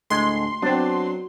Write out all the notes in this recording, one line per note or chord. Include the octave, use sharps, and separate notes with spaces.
D2 A2 G#3 C6
F#3 B3 C4 D4